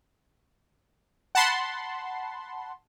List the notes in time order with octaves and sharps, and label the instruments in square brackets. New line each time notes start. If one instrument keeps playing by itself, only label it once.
[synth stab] F#5 A5 B5 C6